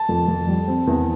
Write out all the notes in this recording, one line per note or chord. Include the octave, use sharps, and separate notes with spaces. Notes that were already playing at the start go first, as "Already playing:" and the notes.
Already playing: A5
F2
F2
G3
C4
E2